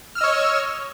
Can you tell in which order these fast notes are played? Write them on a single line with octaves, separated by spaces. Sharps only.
F6 E6 D#5 C#5